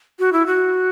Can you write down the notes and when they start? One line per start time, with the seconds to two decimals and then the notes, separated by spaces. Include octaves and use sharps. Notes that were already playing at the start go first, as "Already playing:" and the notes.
0.19 F#4
0.33 E4
0.46 F#4